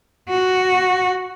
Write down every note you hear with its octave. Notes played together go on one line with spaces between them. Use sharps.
F#4